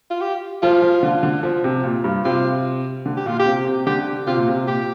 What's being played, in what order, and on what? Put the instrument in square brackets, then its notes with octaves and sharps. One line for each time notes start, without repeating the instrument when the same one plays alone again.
[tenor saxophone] F4
G4
[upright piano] F3 [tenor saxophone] F4
[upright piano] F3
D3
D3
F3
C3
A#2
G2
[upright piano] C3 [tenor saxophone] F4
[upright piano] D3
[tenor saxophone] G4
[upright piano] A#2 [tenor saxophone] F4
[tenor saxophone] G4
[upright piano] C3
C3
[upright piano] D3 [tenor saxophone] G4
[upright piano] C3 [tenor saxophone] F4
[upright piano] A#2
C3
[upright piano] A#2 [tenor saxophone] G4